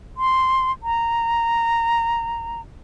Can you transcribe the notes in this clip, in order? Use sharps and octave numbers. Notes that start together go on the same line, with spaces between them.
C6
A#5